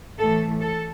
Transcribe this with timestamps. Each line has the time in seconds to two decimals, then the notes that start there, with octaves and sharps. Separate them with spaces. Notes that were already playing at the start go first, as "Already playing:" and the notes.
0.19 A2 E3 A3 A4
0.61 A4